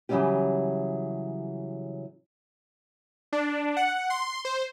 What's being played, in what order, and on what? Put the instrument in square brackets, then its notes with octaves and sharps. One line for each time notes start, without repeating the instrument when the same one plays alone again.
[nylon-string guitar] C#3 E3 F#3 G3 C#4 G4
[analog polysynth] D4
F#5
C6
C5